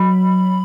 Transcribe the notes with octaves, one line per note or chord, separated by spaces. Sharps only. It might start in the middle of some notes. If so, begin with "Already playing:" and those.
Already playing: F#3 B5